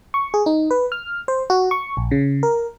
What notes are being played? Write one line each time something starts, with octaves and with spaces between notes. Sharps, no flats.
C#6
G#4
D#4
B4
F6
C5
F#4
C#6
A#1
C#3
A#4